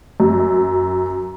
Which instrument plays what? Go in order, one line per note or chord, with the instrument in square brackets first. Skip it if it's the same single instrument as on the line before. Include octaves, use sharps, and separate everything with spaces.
[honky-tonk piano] F#2